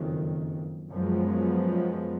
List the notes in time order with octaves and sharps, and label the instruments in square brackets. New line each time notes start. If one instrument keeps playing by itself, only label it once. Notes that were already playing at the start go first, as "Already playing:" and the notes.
Already playing: [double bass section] F#1 F2 D#3
F#2 F3 G#3 B3